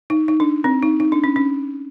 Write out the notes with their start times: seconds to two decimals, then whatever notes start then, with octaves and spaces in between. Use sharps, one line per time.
0.10 D#4
0.28 D#4
0.40 D4
0.64 C4
0.83 D#4
1.00 D#4
1.12 D4
1.24 C#4
1.36 C#4